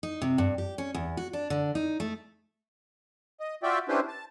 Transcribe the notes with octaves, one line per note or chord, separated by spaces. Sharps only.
D#4
C3
G2
G4
C#4
E2
F#4
D4
D3
D#4
A3
D#5
F4 F#4 D5 E5 G5
C#4 D4 E4 G4 B4 C5
A5